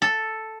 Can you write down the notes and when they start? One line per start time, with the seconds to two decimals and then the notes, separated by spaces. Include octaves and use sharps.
0.02 A4